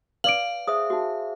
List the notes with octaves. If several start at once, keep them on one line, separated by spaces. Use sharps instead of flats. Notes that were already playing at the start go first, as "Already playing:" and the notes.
B4 D5 F5 D6 D7 F#7
G#4 C5 E5 D#6
D#4 F#4